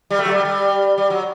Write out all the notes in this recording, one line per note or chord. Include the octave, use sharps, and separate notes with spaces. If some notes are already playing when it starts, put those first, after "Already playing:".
G3
A3
F#3
G3
G3
G3
F#3